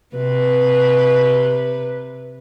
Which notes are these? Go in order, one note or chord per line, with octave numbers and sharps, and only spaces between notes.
C3 B4